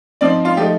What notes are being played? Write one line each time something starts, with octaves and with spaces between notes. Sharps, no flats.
F3 C4 D#4 D5
F4
F3 A3 D#4 G4